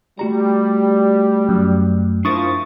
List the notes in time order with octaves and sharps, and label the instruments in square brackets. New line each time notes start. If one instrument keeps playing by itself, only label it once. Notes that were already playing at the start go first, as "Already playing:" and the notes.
[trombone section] G3 [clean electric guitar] A3 F#4 A#5
[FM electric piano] F#2
[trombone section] F3 [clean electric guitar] D4 E4 A#4 [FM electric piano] C#6 D#6 A6